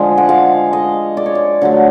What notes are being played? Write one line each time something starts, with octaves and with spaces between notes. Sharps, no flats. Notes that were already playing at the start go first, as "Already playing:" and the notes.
Already playing: D3 F3 G#3
F#5
F5
D#5
D5
C#5
D5
D3 F#3 A3